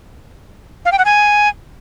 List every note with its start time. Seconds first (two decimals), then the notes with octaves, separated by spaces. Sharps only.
0.85 F5
0.92 G5
0.98 F#5
1.05 G#5